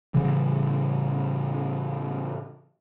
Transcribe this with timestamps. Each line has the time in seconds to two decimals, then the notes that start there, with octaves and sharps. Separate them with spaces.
0.14 A2 C#3 E3 G3